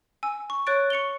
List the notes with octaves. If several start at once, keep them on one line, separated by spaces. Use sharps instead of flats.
G#5 E6
C#6
C#5 C#6 F#6 A6 D7
C#6 C#7 F7 G7